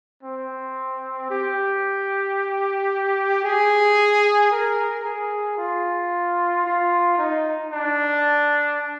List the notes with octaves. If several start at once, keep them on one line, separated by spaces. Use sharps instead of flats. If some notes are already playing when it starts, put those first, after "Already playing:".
C4
G4
G#4
A#4
G#4
F4
F4
D#4
D4